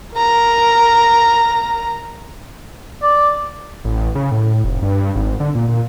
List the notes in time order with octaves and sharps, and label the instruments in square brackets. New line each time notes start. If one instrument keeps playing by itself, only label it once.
[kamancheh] A#4 A#5
[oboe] D5
[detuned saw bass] A1
C#3
A2
F1
G2
G#1
D3
A#2
A#2